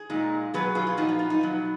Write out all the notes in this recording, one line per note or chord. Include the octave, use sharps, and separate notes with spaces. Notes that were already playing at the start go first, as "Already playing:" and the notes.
Already playing: G#4
A#2 G#3 D#4
B2 F#3 B3 G#4 B4
F4 G#4
F4
A#2 F3 B3 D#4 F#4
F4
F4
D#4
B2 F#3 B3